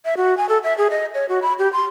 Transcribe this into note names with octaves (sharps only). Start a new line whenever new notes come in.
E5
F#4
G#5
A4
E5
G#4
D#5
C#5
F#4
B5
G4
C6